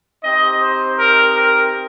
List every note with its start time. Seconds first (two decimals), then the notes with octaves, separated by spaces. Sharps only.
0.24 C4 D#4 G4 D#5
0.61 C5
0.98 A#4
1.35 A#4